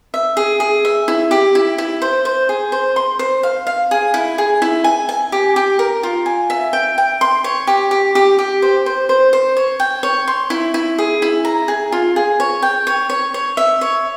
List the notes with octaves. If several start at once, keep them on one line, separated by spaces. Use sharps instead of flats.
E5
G#4
G#4
E5
E4
G4
E4
E4
C5
C5
G#4
C5
C6
C5
F5
F5
G#4
E4
G#4
E4
G#5
G#5
G4
G4
A#4
F4
G#5
E5
G5
G5
C6
C#5
G4
G4
G4
G4
C5
C5
C5
C5
C#5
G5
C#5
C6
E4
E4
G#4
E4
A#5
G#4
F4
G#4
C#5
G5
C#5
C#5
C#5
E5
C#5